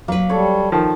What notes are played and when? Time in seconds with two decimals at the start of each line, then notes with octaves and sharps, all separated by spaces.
0.08 F#3 A#3 B4
0.29 G3 A4 C#5
0.72 D#3 F3